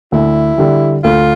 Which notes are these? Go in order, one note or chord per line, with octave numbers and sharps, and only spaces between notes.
D2 E4
D3 G3
D2 F4